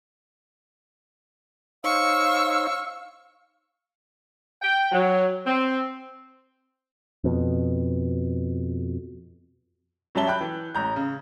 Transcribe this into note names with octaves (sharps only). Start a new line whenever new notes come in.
D#4 C5 C#5 F5 C#6 E6
G5
F#3
C4
F2 B2
F#2 F#3 G3 E5 A5 G7
G5 B5 F#6 G6
E3
A1 A#5 G6
C#3